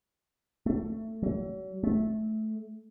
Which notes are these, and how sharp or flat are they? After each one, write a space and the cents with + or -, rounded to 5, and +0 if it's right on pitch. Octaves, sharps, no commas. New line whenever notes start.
A3 +15
F#3 +40
A3 -15